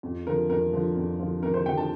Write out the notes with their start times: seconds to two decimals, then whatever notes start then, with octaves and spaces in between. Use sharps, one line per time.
0.03 F2
0.26 D3 F3 A#4
0.49 F2 A#4
0.73 D3 F3
0.96 F2
1.19 D3 F3
1.43 F2 A#4
1.54 C5
1.66 D3 F3 G5
1.77 A5